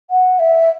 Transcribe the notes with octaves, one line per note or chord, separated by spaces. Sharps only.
F#5
E5